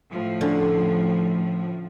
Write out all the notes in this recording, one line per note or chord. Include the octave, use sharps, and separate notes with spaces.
A2 F3
D3 C#4 A#5